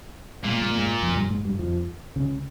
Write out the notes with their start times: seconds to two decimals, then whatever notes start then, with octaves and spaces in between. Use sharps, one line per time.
0.45 A#2 G#3
0.53 A#3
0.61 G#3
0.70 A#3
0.77 G#2 G#3
1.02 F2 F3
1.16 G2 G3
1.30 G#2 G#3
1.45 G2 G3
1.59 F2 F3
2.16 C#2 C#3